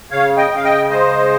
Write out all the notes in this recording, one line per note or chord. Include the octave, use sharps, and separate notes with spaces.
C#3 C#5 F5
D#5 G5
C#3 F5
D#5 G5
G#3 C5 D#5